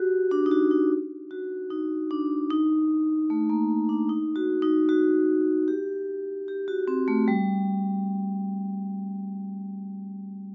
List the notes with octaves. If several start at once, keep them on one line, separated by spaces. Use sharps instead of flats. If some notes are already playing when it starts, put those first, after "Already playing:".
Already playing: F#4 G4
D4
D#4
F#4
D#4
F#4
D#4
D4
D#4
A3
A#3
D4
D#4
F#4
D#4
F#4
G4
G4
F#4
C4
A3
G3